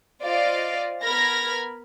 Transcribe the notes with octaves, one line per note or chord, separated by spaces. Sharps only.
F4 C5 D5 D#5 F5
B3 A#4 B5 F6 G#6 A#6